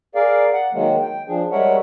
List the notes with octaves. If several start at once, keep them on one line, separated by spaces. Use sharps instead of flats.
G#4 A#4 D5 F5
F#5
D#3 F#3 G#3 A#3
G5
F3 D4 G#4
G3 G#3 A#4 C#5 E5 F#5